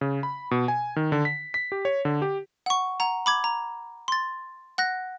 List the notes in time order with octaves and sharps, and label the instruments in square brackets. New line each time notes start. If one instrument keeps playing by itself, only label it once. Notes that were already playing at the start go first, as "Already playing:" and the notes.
[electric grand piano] C#3
B5
B2
G#5
D#3
D3
B6
B6
G4
C#5
D3
G4
[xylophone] F#5 C#6
F#5 A#5
B5 D6 G#6
A#5
C6 A6
F#5 F#6 A#6